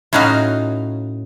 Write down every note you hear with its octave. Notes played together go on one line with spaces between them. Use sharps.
A2 C#4 D#4 F#4 F5